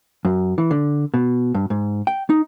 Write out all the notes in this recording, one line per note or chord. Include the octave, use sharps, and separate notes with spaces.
F#2
E3
D3
B2
G2
G#2
G5
D#4